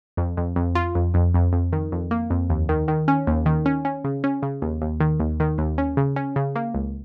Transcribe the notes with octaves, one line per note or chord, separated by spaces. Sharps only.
F2
F2
F2
F4
F2
F2
F2
F2
D#3
F2
A#3
F2
D#2
D#3
D#3
C#4
D#2
D#3
C#4
C#4
C#3
C#4
C#3
D#2
D#2
D#3
D#2
D#3
D#2
C#4
C#3
C#4
C#3
A#3
C#2